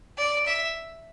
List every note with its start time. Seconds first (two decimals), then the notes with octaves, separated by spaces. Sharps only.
0.17 D5
0.46 E5